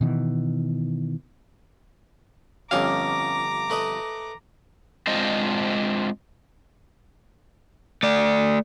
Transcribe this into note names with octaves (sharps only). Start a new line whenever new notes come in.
B2 D#3 E3
G1 F2 C#4 G4 F5 A#5 D6
A3 B4 D#5
G#3 C4 D4 F4 C5 D#5
A3 D5